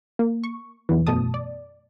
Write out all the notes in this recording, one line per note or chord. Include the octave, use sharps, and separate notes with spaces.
A#3
C#6
B1 E2 E3
F#2 B2 A3 A5 D#6
D5